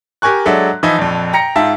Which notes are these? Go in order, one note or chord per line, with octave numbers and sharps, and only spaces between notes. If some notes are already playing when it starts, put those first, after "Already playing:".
G4 A#4 G#5 C#6 F#6
F#3 G#3 D4 A4 E5
E3 F3 D#4 E4
A#1 F2
G5 A#5 A#6 C#7
G#2 F4 E5 G5 A5